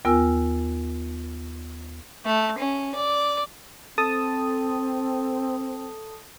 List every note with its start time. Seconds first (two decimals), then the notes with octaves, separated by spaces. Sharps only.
0.05 D#2 B3 F4 A#4 G#5 E6
2.25 A3
2.58 C#4
2.95 D5
3.98 C4 A4 A5 D#6